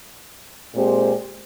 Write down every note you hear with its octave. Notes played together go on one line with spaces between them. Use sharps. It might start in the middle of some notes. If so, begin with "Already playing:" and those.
A#2 G#3 C4 G4 C5